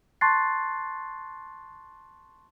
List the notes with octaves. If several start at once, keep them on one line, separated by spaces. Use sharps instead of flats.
A5 C6 C#6 F#6 A6 C7